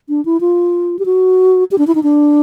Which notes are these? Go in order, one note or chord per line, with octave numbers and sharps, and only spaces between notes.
D4
E4
F4
G4
F#4
G4
D4
E4
D#4
D4